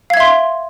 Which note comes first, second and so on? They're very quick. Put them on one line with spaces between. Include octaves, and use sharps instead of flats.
F5 G#6 E5 C6